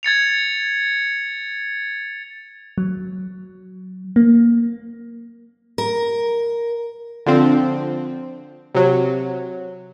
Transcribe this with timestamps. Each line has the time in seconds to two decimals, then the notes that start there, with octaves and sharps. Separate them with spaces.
0.03 G#6 A6 C#7 F7
2.78 F#3
4.16 A#3
5.78 A#4
7.26 D3 F3 C4
8.75 C3 F#3